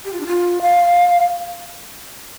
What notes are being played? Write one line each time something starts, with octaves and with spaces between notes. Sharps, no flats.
G4
F4
D4
F4
F5